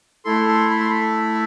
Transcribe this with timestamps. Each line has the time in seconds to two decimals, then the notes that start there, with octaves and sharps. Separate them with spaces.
0.25 A3 E4 A4 C6
0.48 C6
0.71 B5
0.80 C6
0.90 B5